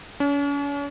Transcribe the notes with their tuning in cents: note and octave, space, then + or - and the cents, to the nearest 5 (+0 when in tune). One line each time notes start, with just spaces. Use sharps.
C#4 +40